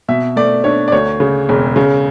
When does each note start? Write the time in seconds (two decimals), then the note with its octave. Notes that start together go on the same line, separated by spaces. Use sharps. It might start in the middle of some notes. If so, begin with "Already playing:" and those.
0.08 B2 E5
0.36 A3 D5
0.64 D4 C#5
0.88 D5
0.92 D2 C#5
1.20 C#3
1.49 E1
1.76 C#3